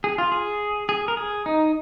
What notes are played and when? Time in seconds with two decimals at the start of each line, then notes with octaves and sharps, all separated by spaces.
0.04 G#4
0.18 F4
0.32 G#4
0.89 G#4
1.08 A#4
1.17 G#4
1.46 D#4